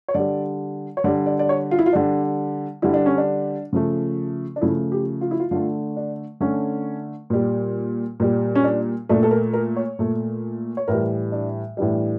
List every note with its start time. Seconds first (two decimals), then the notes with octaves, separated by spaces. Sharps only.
0.08 C#5
0.14 D3 G3 D5
0.97 C#5
1.04 D3 G3 D5
1.26 D5
1.39 D5
1.49 C#5
1.71 F4
1.79 E4
1.86 F4
1.93 D3 G3 D4
2.82 D3 G3 E4
2.94 D4
3.06 C#4
3.18 D4
3.73 C#3 F3 A3
4.56 D4
4.61 C#3 F3 A3 E4
4.92 G4
5.21 F4
5.31 E4
5.40 F4
5.51 D3 A3 F4
5.97 D4
6.41 D3 A3 C#4
7.30 A#2 G3
8.20 A#2 G3
8.55 C#4
8.64 D4
9.09 A#2 A3 D4
9.23 A4
9.31 A#4
9.53 A#4
9.76 C#5
9.99 A#2 A3
10.77 C#5
10.88 A2 E3 G3 A#4
11.32 D4
11.77 A2 E3 G3 D4